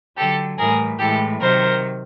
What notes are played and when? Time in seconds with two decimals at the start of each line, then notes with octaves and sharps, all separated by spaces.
0.16 D3 F#3 G4 A4
0.58 A2 E3 G3 G#4 A#4
0.99 A2 E3 G#3 G4 A4
1.40 C3 D#3 F#3 A#4 C5